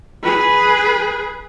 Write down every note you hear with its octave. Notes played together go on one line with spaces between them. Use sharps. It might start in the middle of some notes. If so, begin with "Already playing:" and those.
G#4 B4